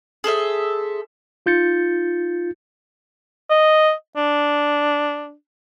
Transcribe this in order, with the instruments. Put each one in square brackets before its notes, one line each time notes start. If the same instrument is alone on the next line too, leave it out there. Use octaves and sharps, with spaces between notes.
[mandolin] G#4 A4 C5 E5
[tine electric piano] D#4 F4 G6 A6 C#7
[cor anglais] D#5
D4